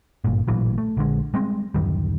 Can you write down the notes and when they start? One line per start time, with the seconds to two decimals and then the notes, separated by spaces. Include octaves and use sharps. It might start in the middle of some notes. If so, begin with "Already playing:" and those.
0.24 G#1 G2 A#2
0.48 A1 A#2 E3 F#3
0.78 A3
0.97 A#1 D3 G#3
1.34 G3 G#3 C4
1.74 D1 F#2 D#3 G3